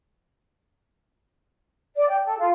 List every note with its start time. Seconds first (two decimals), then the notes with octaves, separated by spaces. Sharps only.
1.95 D5
2.09 G5
2.24 A4
2.38 F4